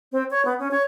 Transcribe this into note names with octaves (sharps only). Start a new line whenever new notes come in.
C4
C#5
B3
C#4
C#5